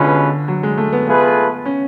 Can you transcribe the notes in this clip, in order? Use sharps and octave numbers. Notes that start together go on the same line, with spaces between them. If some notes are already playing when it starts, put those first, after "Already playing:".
Already playing: B2 D3 G#3 C#4 F4 B4
F#3
G#3
A3
B3
A3 B3 F4 G#4 B4
C#4